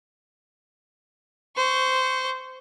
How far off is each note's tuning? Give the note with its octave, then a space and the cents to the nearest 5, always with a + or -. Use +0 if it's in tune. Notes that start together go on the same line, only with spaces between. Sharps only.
C5 -15 C#6 +0